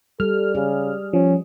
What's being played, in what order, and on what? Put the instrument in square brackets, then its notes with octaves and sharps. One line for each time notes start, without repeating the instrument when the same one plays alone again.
[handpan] G3 [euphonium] A4 [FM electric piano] F6
[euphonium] C#3 [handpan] G#4
[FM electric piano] F3 [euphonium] C#4